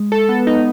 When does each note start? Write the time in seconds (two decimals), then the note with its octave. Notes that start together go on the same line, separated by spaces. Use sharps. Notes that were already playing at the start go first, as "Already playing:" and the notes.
Already playing: G#3
0.12 A4
0.29 B3
0.47 D#4